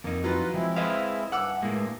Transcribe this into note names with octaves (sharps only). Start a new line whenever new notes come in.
F2 A#3 D#4
E3 F#3 F4 B4
F3 G#3 C4 E4
B4 C5 D#5 F5
G2 E3 F#5 D6 E6
A2 G#3 A#3